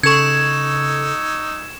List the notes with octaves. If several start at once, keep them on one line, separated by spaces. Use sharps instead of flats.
C#3 D#4 A4 C#6 E6 G#6 C#7 E7